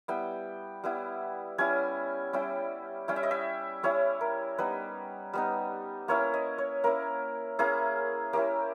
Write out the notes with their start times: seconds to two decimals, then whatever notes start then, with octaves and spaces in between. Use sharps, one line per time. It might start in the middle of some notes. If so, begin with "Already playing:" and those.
0.08 G3 B3 E4 G5
0.84 G3 B3 E4
1.58 G3 C#4 E4 G#5
2.33 G3 C#4 E4 G5
3.08 G3 C#4 E4 G5
3.16 E5
3.23 D#5
3.31 E5
3.83 G3 C#4 E4 C#5
4.21 A#4
4.58 G3 B3 D#4 B4
5.33 G3 B3 D#4
6.08 A#3 C#4 E4 C#5
6.34 D#5
6.58 C#5
6.84 A#3 C#4 E4 A#4
7.59 A#3 C#4 E4 G#4
8.33 A#3 C#4 E4 G4